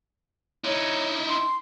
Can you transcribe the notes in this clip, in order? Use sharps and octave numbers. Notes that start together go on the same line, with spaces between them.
D#4 E4 C#5
C6